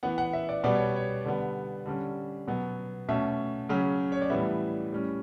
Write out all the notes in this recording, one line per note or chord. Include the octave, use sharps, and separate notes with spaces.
E3 B3 F#5
F#5
E5
D5
B2 G3 B3 D5
C#5
C#5
D3 G3 B3
D3 G3 C#4
B2 F#3 B3
B2 A3 C#4 E5
C#3 F#3 C#4
C#5
D5
A2 E3 G3 B3 E5
A2 G3 C#4